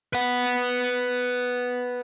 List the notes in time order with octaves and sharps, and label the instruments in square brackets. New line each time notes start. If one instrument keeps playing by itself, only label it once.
[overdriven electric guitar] B4 F#5